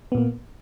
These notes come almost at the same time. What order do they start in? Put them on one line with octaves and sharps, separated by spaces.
B3 A#2 A#3